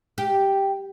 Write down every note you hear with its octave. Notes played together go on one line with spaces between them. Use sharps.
G4